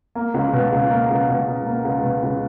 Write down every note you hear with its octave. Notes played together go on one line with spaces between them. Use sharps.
A#3
C#2
B2
C#2
A#3
C#2
B2
C#2
A#3
C#2
B2
C#2